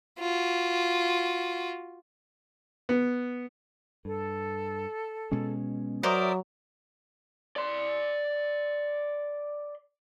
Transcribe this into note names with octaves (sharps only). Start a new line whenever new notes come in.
F4 F#4
B3
G2 A4
B2 G#3 C#4
F#3 A#4 C5 D5 E5 D#6
D5 C6